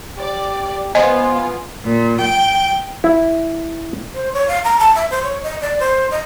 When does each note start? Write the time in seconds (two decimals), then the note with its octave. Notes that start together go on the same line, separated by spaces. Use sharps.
0.17 G4 D5
0.95 B3 F4 C5 D#5 G#5
1.85 A#2
2.21 G5
3.04 E4
4.14 C5
4.33 C#5
4.48 F5
4.64 A#5
4.80 A5
4.95 E5
5.11 C5
5.23 C#5
5.43 D#5
5.61 D5
5.80 C5
6.11 D#5